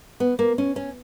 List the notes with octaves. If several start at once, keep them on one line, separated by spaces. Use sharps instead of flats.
B3
A#3
C#4
C#4